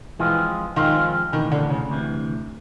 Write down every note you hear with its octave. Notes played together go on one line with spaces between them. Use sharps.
E3 F3 G#3 C4 F4
D#3 F3 G#3 C4 F4
D2 C3 D#3 E3
D3
C#3
D2 C3 E3